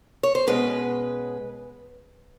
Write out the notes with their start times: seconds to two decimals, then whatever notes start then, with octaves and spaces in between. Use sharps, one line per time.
0.23 C#5
0.35 C5
0.47 B2 G#3 C#4 B4